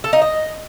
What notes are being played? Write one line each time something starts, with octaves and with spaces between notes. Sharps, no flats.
A4
D#4
D#5